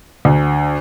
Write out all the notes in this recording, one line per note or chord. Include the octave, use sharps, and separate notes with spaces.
D2